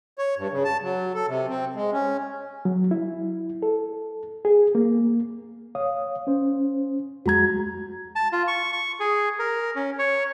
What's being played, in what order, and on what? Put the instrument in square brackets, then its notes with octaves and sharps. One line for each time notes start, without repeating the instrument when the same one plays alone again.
[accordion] C#5
G2
C#3
A5
F#3
A4
C3
C4
G#3
C#4
[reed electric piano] F#3
E4
A4
G#4
A#3
C#5 F5 D#6
C#4 C5
[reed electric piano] F2 G#3 A#5 [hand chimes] F#4 G#6
[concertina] A5
F4
C#6
C#6
G#4
A#4
C#4
C#5